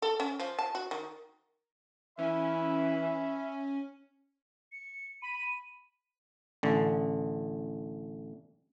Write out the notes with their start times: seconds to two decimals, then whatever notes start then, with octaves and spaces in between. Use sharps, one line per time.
0.02 A4
0.20 C#4
0.40 F3
0.59 A5
0.75 F#4
0.91 D#3
2.19 E3 C#4 E5 B5
4.72 C#7
5.22 B5 D#7
6.63 A1 D3